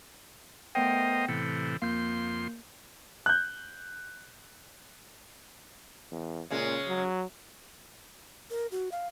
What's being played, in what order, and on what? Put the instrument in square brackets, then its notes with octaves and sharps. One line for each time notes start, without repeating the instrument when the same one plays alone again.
[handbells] A3 B3 G5 [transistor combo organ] A#4 C5 D#5
[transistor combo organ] A2 C3 E3 [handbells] C#7
[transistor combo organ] F2 C6 [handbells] A#3 G6
[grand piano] F#6 G6
[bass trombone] E2
[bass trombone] A#2 [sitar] C#3 G#3
[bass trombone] F#3
[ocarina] A#4
F#4
F5